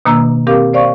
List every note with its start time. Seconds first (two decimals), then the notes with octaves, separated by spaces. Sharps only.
0.06 B2 D#3 A#3 D4 A#5 E6
0.47 C4 G4 A#4 F5 D6
0.73 C5 D5 F5 C#6